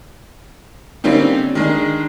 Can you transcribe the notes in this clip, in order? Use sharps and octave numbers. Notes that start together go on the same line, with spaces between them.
D3 G3 A#3 C4 C#4 D#4
D#3 G#3 D4